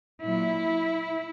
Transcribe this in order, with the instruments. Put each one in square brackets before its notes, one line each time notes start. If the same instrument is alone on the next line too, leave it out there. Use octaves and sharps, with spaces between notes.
[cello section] A#2 F#3 E4